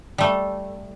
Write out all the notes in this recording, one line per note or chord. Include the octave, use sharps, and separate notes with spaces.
G3 A3